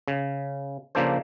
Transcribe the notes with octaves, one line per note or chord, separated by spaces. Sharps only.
C#3
C#3 F3 A#3 D4 A4 C5